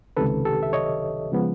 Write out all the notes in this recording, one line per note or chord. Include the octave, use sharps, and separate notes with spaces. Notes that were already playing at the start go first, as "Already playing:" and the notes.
C#2 C3 D#3 A4 B4
G4 A4
E5
C#5 D#5
C#3 F3 G#3 B3